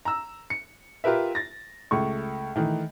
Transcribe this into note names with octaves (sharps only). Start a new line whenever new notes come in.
A#5 E6
C#7
F4 G4 A#4 B4 E5
A6 A#6
C#2 A3 C#6
D#3 E3 A3